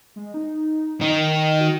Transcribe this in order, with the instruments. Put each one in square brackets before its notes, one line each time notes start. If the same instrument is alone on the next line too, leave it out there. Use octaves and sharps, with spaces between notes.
[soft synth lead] G#3
D#4
[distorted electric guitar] D#3 [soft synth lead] D#5
[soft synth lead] F#4